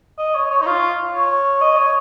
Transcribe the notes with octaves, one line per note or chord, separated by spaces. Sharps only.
D#5
C#5
C#5
D#4
F4
C#5
D#5
C#5